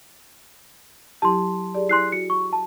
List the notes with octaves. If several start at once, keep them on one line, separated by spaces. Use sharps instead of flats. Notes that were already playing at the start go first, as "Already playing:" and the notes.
F#3 E4 G4 A5 C6
G4 G#4 D5
E4 G#5 C6 F#6 C7
F#4 C#7
C#6
A5